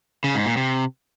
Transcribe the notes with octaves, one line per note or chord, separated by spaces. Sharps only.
C#3
G#2
A#2
C3